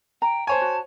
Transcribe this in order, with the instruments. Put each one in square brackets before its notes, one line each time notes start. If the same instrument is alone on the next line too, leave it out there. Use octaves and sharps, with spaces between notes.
[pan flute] G5 [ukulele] A#5
[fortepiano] C5 C#5 G#5 [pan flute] A5
[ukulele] F#4